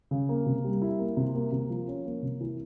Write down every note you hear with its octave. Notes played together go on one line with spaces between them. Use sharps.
C#3
A#3
C3
G3
E4
A#3
C3
A#3
C3
F3
C#4
A#3
C3
E3